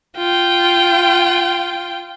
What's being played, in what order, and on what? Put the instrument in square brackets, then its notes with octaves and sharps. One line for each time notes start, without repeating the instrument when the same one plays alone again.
[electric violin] F4 G5